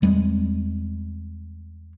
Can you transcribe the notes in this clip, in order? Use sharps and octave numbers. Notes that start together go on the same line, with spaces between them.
E2 G3 G#3 C4